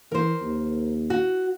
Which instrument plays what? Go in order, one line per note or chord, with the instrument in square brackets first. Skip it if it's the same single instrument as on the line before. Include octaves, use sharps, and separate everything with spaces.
[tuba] E3 [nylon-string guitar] A#4 C5
[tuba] D#2
[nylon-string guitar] F#4